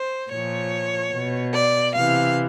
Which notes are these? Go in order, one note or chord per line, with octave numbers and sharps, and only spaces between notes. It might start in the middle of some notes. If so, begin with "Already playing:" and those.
Already playing: C5
A#2 F3 C#5
B2
D5
C3 E3 F5